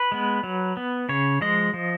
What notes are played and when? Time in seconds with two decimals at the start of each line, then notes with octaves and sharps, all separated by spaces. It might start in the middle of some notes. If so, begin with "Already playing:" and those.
Already playing: B4
0.12 G#3 B3
0.43 F#3
0.77 B3
1.09 C#3 C#5
1.41 F3 G#3 D#5
1.74 F3